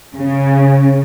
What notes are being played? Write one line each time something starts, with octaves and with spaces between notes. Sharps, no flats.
C#3